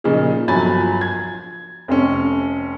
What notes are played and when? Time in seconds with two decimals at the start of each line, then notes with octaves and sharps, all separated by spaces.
0.04 A#2 C#3 F3 D#4 G#4
0.48 G1 F3 F#3 G#5 B5 A6
1.01 G#6
1.88 F1 C4 C#4